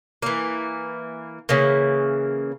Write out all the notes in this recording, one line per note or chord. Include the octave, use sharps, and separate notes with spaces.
E3 A#3
C#3 E3 A#3